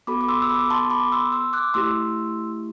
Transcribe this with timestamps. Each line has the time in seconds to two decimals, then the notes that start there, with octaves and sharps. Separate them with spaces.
0.07 B3 F#4 A4 B5 D6
0.21 D6
0.29 C6 E6
0.42 E6
0.49 B5 D6
0.70 A5 C6
0.90 B5 D6
1.12 C6 E6
1.32 C6 E6
1.53 D6 F#6
1.74 A3 E4 G4 C6 E6